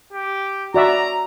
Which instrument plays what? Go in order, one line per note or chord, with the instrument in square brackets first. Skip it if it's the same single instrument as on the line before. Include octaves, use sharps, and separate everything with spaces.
[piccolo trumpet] G4
[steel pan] F#4 D5 E5 [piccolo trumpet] A#5